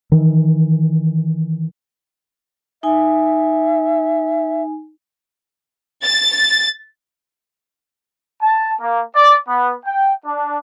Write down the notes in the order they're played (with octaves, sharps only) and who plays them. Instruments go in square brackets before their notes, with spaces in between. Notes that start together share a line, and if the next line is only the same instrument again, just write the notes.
[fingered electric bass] D#3 E3
[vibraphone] D#4 G#5 [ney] E5
[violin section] A6
[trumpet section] A5
A#3
D5
B3
G5
D4